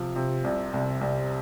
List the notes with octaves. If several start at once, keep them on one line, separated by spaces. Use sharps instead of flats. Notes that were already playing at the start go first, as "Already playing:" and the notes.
Already playing: C3 F3
C3
C2
C2
C2